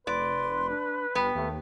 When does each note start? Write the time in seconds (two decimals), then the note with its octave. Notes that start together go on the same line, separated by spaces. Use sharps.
0.07 F1 B4 D5 C6
0.70 D4
1.15 G1 B3 G5
1.35 D#2 A3